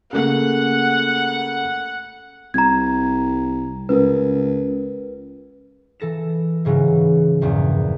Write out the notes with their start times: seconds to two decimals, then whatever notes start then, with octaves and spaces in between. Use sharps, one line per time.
0.13 C#3 A3 A#3 F#5
2.54 C2 A#5 G#6
3.89 C#2 A#4 B4
6.00 E3 A4 A#6 E7
6.65 G#2 C#3 E3 F#3
7.41 A#1 E2 G2 A#2